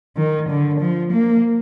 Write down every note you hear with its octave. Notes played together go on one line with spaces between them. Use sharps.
D#3
D3
F3
A#3